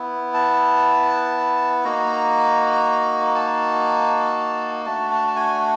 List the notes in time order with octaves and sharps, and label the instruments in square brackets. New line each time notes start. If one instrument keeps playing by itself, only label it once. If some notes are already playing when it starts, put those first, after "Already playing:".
Already playing: [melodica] B3 E4
A5
A#3 D#4 F#4 A#5
A5
A3 D4 F#4 A5
A5
A5
G#5